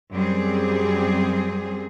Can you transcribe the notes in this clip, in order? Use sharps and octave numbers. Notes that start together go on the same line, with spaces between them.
F#2 G3 C4 G#4